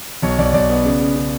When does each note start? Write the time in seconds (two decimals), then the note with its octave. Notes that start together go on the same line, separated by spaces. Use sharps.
0.22 B1 C#5
0.38 B1 D5
0.54 B1 D5
0.69 B3
0.85 C#3
1.01 C#3
1.16 C#3